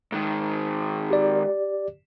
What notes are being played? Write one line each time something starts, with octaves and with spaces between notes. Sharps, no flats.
G#2 D#3
G4 D5